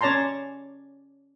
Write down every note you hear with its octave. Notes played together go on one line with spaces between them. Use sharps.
C#4 C#5 D5 A5 A#5 C6